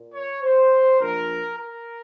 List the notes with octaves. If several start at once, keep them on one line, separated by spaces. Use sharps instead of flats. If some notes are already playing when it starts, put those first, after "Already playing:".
Already playing: A#2
C#5
C5
A#1 A#2 F3 A#4
A#4